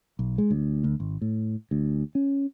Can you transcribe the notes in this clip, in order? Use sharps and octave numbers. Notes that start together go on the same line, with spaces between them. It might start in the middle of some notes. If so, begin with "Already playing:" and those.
B1
G#3
D2
D2
G#1
A2
D2
C#4